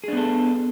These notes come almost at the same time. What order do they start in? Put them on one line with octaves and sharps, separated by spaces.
G#4 D4 B3 A4